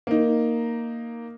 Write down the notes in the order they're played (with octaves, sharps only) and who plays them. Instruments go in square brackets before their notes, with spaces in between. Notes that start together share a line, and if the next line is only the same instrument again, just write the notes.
[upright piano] A#3 D#4